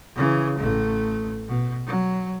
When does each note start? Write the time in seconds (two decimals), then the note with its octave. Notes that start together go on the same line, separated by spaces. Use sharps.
0.16 C#3 E3
0.58 A1 A3
1.48 B2
1.87 F#3